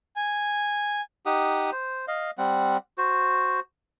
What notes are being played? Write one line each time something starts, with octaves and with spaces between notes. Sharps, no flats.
G#5
D#4 G4 F#5 D#6
C5
D#5 F5
G3 C4 F#5
F#4 C5